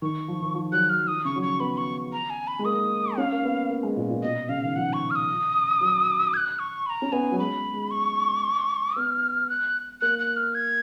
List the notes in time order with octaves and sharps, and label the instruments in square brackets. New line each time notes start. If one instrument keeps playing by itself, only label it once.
[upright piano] D#3 [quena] C#6
[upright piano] F3
D#3
F3
[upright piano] F#3 [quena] F#6
[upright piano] F3 [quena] F6
[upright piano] D#3 [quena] D#6
[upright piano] C#3 [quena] C#6
[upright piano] F#3
[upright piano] F3 [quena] C#6
[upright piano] B3 [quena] B5
[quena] C#6
A#5
G#5
B5
[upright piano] G#3
[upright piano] A#3 [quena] D#6
[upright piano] C#4 [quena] F5
[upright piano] A#3
B3
A#3
G#3
A#2
A#2
[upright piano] B2 [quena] D#5
[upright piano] C#3 [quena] F5
[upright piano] D#3
[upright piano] F3 [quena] F#5
[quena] C#6
F6
D#6
[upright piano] F#3
[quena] G#6
F#6
C#6
B5
A#5
[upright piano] C#4
[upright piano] B3 [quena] G#5
[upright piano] F#3
[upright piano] G#3 [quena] B5
[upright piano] G#3
[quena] C#6
[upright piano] B3 [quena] F6
[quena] F#6
[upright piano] A#3 [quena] F#6
[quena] F#6
F6
G#6